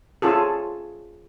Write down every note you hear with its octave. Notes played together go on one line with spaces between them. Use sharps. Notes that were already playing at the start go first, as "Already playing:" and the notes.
C#4 F4 G#4 A4